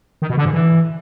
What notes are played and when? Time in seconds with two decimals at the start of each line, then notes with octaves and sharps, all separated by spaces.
0.22 D#3
0.30 B2
0.38 D3
0.45 G#2
0.53 E3